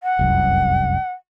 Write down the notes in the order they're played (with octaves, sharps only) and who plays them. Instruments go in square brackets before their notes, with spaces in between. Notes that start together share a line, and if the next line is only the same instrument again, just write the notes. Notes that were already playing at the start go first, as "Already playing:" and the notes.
[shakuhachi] F#5
[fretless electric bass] F1 C2 F#2